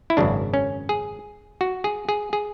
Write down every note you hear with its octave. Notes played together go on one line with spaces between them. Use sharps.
E4
G#1 F#2 C#3 D4
C#4
G#4
F#4
G#4
G#4
G#4